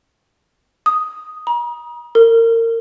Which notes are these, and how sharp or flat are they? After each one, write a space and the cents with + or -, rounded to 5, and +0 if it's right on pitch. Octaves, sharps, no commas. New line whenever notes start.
D#6 +0
A#5 +40
A#4 -30